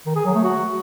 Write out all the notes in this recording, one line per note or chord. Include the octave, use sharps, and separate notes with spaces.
D#3
G#4
F#3
A3
F#4